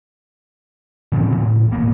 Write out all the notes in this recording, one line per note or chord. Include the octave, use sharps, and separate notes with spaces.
A2 C#3 F3 C4
A2
E1 A#3 B3